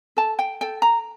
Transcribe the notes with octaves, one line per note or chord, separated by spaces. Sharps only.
A4 A5
G5
A4 G5
A#5